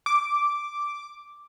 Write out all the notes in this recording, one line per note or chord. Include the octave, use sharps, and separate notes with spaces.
D6